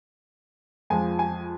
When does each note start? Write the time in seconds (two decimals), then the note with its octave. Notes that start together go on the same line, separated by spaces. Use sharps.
0.90 F2 F3 G#3 G#5
1.19 G#5